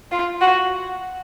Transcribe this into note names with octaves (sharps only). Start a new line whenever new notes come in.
F4
F#4